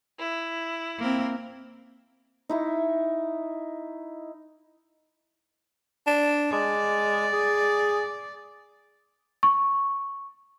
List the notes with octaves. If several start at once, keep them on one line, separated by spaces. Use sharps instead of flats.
E4
A#3 C4
D#4 E4 C#6
D4
G#3 D5
G#4
C#6